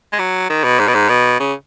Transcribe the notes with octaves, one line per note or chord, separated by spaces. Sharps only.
G#3
F#3
D#3
B2
G#2
B2
G#2
B2
C#3